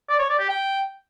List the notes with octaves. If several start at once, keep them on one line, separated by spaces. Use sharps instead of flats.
D5
C#5
D5
G4
G5